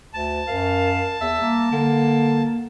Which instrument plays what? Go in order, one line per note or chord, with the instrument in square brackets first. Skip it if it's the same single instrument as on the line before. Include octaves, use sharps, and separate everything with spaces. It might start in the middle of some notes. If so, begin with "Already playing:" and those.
[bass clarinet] D2 [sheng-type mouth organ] A5
[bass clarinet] F#2 [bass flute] A#4 [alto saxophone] F5
[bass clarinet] E2 [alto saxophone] E5
[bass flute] G3 [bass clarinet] A#3
[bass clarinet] D3 [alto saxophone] A#3